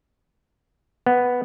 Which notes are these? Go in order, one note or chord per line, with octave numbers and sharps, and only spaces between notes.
B3